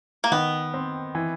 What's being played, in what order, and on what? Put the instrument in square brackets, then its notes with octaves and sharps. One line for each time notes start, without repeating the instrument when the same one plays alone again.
[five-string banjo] A#3
[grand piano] D#3 [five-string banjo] B3
[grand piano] C4
E3